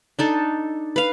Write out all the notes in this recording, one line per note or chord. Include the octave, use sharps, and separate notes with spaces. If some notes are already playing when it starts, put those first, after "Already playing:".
D4 D#4 A4
B4 F5